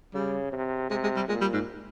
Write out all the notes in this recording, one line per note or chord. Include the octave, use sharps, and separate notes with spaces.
C#3 G3
C3
C3 G#3
G#3
G3
A#2 G#3
G3
G#2